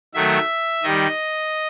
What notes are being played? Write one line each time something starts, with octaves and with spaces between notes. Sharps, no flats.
D#3 F#3 A3 E5
D#3 G3 D#5